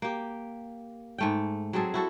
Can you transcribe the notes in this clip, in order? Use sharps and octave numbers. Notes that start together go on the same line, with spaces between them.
A#3 G4
G#2 A3 G5
F#3 C4 G#4 A4
E4 F#4 A4